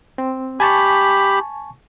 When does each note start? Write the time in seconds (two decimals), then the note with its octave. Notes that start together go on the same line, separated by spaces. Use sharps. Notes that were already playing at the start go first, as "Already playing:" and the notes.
0.18 C4
0.60 G4 G#5 A5 B5 C#6